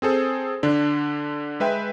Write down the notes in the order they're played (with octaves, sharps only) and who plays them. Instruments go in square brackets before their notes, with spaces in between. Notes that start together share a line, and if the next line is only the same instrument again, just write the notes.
[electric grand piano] C4 G#4 A4 C5
D3 D4
G#3 B4 E5 G5